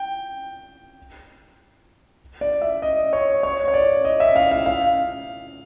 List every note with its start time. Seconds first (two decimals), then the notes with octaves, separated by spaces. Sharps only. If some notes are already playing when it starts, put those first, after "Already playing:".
Already playing: G5
2.41 D5
2.62 E5
2.82 D#5
3.13 C#5
3.43 C#5
3.68 C#5
3.74 D5
4.05 D#5
4.20 E5
4.36 F5
4.52 F5
4.66 F5